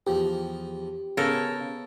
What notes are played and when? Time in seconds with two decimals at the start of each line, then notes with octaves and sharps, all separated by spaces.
0.07 E2 F3 G4
1.17 C#3 B3 A4 A#4 C#5